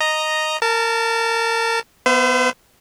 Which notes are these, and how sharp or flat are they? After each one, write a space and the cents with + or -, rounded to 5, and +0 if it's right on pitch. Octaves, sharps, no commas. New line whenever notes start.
D#5 -5 A#5 +0
A#4 -25 A5 +0
B3 +0 C5 -40 E5 +35